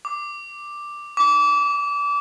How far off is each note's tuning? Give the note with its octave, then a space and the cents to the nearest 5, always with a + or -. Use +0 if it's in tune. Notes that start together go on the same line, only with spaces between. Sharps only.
D6 +5
D6 -30